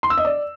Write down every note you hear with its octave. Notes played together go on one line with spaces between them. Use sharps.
C6
E6
D#5
D5